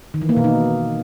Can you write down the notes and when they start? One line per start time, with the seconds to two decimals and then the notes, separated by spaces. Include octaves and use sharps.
0.14 D#3
0.22 E3
0.29 A#3
0.37 B2
0.44 D#4